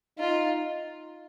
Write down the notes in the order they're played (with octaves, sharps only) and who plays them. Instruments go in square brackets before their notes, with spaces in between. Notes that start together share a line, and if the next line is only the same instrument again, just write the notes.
[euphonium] D#4 [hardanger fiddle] F4